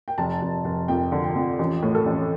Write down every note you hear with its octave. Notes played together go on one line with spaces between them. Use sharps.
G5
F1 A5
F1
F1
F2 G5
D3
G5
F2
A1
A2
A4
A1